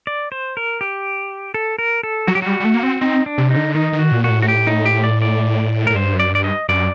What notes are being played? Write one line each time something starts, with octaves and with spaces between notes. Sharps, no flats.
D5
C5
A#4
G4
A4
A#4
A4
F#3 F#4
G4
G3 F#4
G3
A3
A#3
C4
C4 D#4
D4
C3
D#4
D3
D#3 D#4
D#3
F#4
A#2
F#4
A2
F#4
G4
D#4
G4
D5
D5
A2 A#4
G2 C5
F#2
D5
G2 D5
D#5
F#2 D5